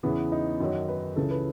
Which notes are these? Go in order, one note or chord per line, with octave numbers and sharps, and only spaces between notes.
E2 C#3 E3 B3
D#4
F#2 D#3 F#3
B4
C#2 C#3 E3 A4
B4